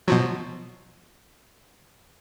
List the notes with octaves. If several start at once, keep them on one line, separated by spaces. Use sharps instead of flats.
B2 F3 F#3